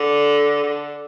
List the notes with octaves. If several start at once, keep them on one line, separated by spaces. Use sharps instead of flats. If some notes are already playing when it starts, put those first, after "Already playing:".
Already playing: D3
D3